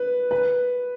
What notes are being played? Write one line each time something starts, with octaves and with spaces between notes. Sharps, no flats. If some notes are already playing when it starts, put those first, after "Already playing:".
Already playing: B4
B4